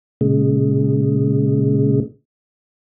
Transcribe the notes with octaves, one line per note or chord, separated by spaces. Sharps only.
A#2 C#3 G#3